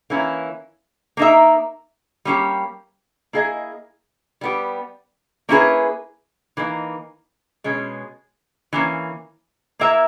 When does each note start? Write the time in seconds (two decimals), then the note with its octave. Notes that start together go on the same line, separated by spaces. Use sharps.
0.10 E3 A#3 C#4 E4
1.17 A#3 D#4 A#4 E5
2.25 G3 A#3 C#4 G4
3.33 A#3 E4 G#4 D#5
4.41 G3 B3 G4
5.49 A#3 C#4 E4 G#4 B4
6.57 E3 A#3 D#4
7.64 B2 G#3 C#4
8.73 E3 A#3 C#4
9.79 A#3 E4 A#4 E5